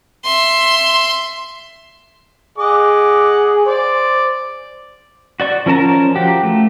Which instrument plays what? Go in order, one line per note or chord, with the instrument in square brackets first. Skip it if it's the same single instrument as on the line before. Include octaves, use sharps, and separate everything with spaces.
[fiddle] E5 C6
[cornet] G#4 [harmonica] D#5 F#5 D6
[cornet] C5 [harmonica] D5
[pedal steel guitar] F#4 D5 C#6
F3 C#4 A#4 A5 A#5
F3 F#4 G4
A3